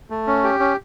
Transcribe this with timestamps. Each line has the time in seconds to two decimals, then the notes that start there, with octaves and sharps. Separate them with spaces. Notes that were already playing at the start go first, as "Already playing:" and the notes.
0.10 A3
0.27 C#4
0.44 G4
0.60 C#4